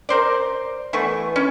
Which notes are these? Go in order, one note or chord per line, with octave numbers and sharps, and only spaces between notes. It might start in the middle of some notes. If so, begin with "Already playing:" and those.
A#4 C5 D5
E3 A3 B3 C#6
C#4